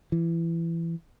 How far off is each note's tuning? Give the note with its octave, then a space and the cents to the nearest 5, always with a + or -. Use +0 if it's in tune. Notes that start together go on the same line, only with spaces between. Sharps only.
E3 +20